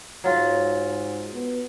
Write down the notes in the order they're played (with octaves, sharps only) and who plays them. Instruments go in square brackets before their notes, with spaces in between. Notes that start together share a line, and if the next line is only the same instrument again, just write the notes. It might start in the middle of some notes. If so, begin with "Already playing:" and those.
[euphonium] G#2 [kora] F#3 F4
[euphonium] B3